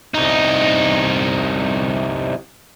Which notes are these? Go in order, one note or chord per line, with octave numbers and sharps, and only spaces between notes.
C2 D#4